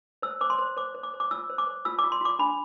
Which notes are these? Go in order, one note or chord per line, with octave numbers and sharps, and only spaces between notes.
C5 E6
C5 D6
C6
C5
C5 D6
C5
D6
C5
D6
F4 E6
C5
D6
C5
F4 E6
D6
F4
C6
F4 D6
D4 B5